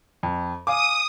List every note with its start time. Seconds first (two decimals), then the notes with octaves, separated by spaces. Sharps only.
0.23 F2
0.67 F5 G#5 D6 D#6